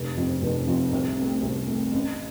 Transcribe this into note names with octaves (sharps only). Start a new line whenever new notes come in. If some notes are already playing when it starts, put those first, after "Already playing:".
Already playing: F1
F2 F3
F1
F2 F3
C2
C3 A3
C2
C3 A3
A1